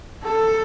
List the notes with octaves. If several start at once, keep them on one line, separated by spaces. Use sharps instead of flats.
A4